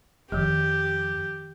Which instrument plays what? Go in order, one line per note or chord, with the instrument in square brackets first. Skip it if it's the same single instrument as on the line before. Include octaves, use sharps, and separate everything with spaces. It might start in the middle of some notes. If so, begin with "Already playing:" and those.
[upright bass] F2 [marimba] D#3 F3 [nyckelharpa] G4